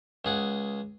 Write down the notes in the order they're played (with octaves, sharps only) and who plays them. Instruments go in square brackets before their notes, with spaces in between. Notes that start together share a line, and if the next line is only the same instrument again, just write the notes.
[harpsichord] C#2 G#4 F#5